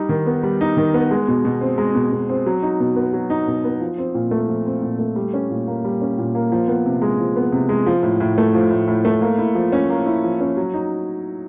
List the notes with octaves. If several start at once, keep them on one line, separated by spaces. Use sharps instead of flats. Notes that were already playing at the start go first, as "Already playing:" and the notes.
Already playing: G3 D#4
D#3
B3
G3
D#4
D#3
B3
G#3
B2
B2
C4
G#3
B2
B2
C4
F#3
D#4
B2
B3
F#3
D#4
B2
B3
F3
C4
A#2
A3
F3
C4
A#2
A3
G3
C#4
A#2
A#3
G3
C#4
A#2
A#3
F3
B3
C3
G#3
F3
B3
C3
G#3
F3
A2
A2
A3
F3
A2
A2
A3
A#3
E4
F3
C#4
A#3
E4
F3
C#4
F#3
D#4